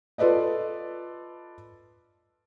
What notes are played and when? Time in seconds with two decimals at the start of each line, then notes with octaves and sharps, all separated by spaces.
0.18 F4 A4 B4 D5 D#5